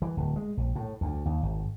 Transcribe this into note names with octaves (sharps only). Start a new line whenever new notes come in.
E3
D1
G#3
A#1
A2
D2
D#2
G#1